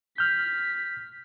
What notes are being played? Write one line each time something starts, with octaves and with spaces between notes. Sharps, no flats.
F6 G6 B6